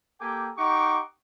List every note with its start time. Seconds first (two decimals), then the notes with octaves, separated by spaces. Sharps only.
0.20 A#3 G4 A4 G5 G#5 D6
0.57 D#4 G4 F#5 C#6 D6